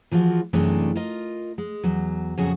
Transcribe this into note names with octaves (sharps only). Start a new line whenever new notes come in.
E3 F3 G#3 F4 F#4
F#2 C3 E3 G#3 A3 D4
F4 A#4 D#5
G#3
E2 F#3
F2 A#2 C#3 F#3 F#4 G#4